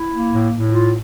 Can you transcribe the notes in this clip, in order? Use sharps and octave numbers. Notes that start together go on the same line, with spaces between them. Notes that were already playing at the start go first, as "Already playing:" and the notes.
Already playing: E4
A#3
A2
A2
F4